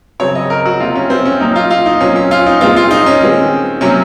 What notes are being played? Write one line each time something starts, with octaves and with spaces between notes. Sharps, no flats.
C#3 F#3 C4 C#5
D#5
A#4
F#4
C3 F#3 A#3 F4
C#4
C4
C#4
A#2 F#3 A#3 D#4
F4
F4
D#4
A#2 F#3 C4 C#4
C#4
F4
D#4
A#2 G#3 C4 F4
F4
D#4
C#4
D#3 G#3 C4
C3 F#3 A#3 C#4